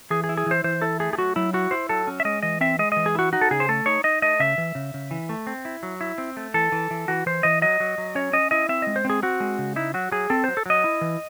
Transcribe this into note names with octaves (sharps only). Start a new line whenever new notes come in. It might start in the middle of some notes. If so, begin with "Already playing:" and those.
E3 G#4
G#4
E4
G#4
E3 C5
E3 C5
E4 A4
A3 G#4
G#4
F#3 F#4
F#3 E4
E4 F#4
E4 C5
F#3 A4
C#4
E5
G#3 D#5
E3 D#5
C4 E5
G#3 D#5
E3 D#5
G#4
E4 F#4
D#4 F#4
A4
C#3 G#4
C5
A3 A4
D#4 C#5
D#4 D#5
A3 D#5
C#3 E5
E3
C#3
C#3
E3
A3
C4
E4
F#3
E4
C4
A3
E3 A4
E3
E3
E3 F#4
E3 C5
E3 D#5
F#3 D#5
F#3
F#3
C#4 C#5
C#4 D#5
E4 D#5
C4 E5
G#3 D#5
C5
C4 G#4
C4 F#4
G#3
C#3
D#4 E4
F#3 F#4
F#3 G#4
C4 A4
F#3 C5
A4
F#3 D#5
E4
E3